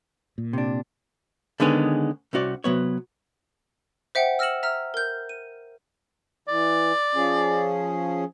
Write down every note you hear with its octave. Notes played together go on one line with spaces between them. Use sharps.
A#2
C3 D4
D3 D#3 G#3 B3 C#4 G#4
C2 C#4 F#4 D5
C3 F#3 B3 C#5
C5 E5 F#5 G5
E6 F6 A#6 C#7 E7 F#7
E5 A#5 E6 F6
A#4 G6
D#7
E3 D5
F3 C#4 G#4